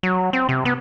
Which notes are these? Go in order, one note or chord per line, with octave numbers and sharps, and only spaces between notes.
F#3
C4
C3
B3